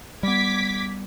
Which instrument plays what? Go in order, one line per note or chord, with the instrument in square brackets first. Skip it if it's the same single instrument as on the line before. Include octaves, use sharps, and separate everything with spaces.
[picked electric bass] G3 B3 [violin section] D6 G#6 B6